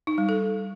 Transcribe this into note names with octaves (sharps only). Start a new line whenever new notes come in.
D#4
G3
A4